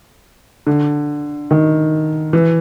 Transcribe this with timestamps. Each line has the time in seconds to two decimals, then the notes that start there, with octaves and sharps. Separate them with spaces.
0.67 D3
1.51 D#3
2.33 E3